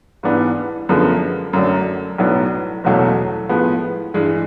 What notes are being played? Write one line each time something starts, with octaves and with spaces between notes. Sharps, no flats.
G#2 E3 G3 B3 D4
F#2 D3 F3 G#3 B3
F#2 D3 F#3 A3 D4
B1 A2 F#3 B3 D4
F#1 E2 B2 F#3 A3
A2 F3 G#3 B3
G2 E3 G#3